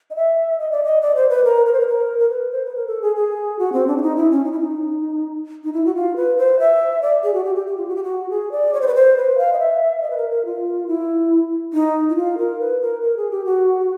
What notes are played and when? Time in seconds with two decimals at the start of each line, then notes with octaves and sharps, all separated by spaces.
0.10 D#5
0.16 E5
0.59 D#5
0.71 D5
0.84 D#5
1.02 D5
1.16 C5
1.29 B4
1.44 A#4
1.66 A#4
1.73 C5
1.80 B4
1.87 A#4
2.19 A#4
2.30 B4
2.51 C5
2.65 B4
2.76 A#4
2.87 A4
3.02 G#4
3.16 G#4
3.59 F#4
3.73 C4
3.87 D4
3.97 E4
4.02 D#4
4.16 E4
4.31 C#4
4.44 D#4
4.52 E4
4.60 D#4
5.64 D#4
5.73 E4
5.86 F#4
5.95 F4
6.16 B4
6.38 C5
6.59 E5
7.02 D5
7.23 G#4
7.34 F#4
7.44 G4
7.56 G4
7.67 G4
7.77 F4
7.88 F#4
7.96 G4
8.04 F#4
8.30 G#4
8.52 D5
8.74 C#5
8.81 C5
8.87 B4
8.95 C5
9.17 B4
9.38 F5
9.53 D#5
9.59 E5
10.02 D#5
10.10 B4
10.17 A#4
10.30 A#4
10.45 F4
10.88 E4
11.73 D#4
12.10 E4
12.16 F4
12.38 A#4
12.60 B4
12.81 A#4
13.02 A#4
13.17 G#4
13.31 G4
13.45 F#4